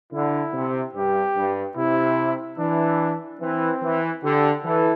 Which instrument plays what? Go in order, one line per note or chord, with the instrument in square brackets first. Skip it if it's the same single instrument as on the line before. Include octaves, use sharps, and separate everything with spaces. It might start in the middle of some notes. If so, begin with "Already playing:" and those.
[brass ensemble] D3 [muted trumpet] E4
[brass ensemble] C3
[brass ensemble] G2 [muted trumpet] G4
[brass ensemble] G2
[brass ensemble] C3 [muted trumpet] E4
[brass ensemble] E3 [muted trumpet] D4
[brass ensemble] E3 [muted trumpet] C4
[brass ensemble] E3
[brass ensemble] D3 [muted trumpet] G4
[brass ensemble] E3 [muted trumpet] A4